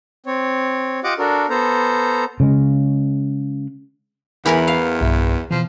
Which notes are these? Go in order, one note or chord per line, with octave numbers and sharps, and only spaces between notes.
C4 C#5
F4 G4 D#5 F#5 D6
D4 F#4 A4 A#4
B3 A4 C5 A#5
C#3 G#3
E2 E3 A#4 B5
F5
B1 G2 E5
B2 E3 F3